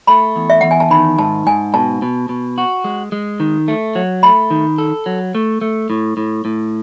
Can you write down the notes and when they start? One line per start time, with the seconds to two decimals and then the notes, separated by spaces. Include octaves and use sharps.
0.07 A3 B5
0.36 E2
0.50 E5
0.61 E2 F#5
0.71 G#5
0.80 A5
0.90 D#3 B5
1.18 G#2 A5
1.47 G#2 G#5
1.74 B2 A5
2.02 B2
2.29 B2
2.58 F#4
2.84 G#3
3.12 G#3
3.40 D#3
3.68 A3
3.95 F#3
4.23 A3 B5
4.50 D#3
4.78 A4
5.06 F#3
5.35 A3
5.61 A3
5.90 A2
6.17 A2
6.45 A2